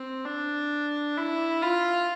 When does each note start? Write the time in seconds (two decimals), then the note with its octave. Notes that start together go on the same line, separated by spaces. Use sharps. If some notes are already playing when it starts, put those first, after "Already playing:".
Already playing: C4
0.25 D4
1.17 E4
1.62 F4